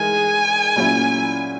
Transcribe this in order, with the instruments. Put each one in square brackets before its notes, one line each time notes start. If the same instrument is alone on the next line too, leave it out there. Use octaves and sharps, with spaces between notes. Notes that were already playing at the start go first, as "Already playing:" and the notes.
Already playing: [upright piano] E3 G#3 D#4 A#4 [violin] G#5
[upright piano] A#2 F#3 A#3 C#4 E4